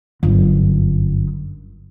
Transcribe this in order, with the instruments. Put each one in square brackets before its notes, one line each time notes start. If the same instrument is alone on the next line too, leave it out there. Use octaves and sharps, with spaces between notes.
[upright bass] G1 F#2